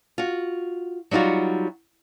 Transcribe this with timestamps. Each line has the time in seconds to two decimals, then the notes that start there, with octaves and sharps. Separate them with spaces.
0.18 F4 F#4
1.11 F#3 G3 D#4 F4 F#4